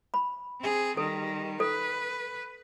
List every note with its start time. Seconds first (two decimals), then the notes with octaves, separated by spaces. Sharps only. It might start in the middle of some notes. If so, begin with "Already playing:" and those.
0.14 B5
0.60 C4 G#4
0.97 D#3 G3 A4
1.60 A4 B4